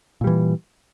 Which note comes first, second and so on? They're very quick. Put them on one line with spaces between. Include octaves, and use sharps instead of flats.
A#2 G3 E3